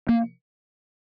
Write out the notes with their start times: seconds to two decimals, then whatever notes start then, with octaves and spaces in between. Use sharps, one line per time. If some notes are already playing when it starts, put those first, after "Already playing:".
0.09 A#3